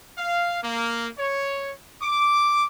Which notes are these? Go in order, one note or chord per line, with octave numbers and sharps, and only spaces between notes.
F5
A#3
C#5
D6